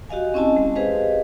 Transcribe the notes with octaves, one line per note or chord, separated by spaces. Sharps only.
F#4 G4 D#5 F5 G#5
C4 C#4 E4 D#5 G#5 A5
G#3
G4 G#4 B4 C5 D#5 F5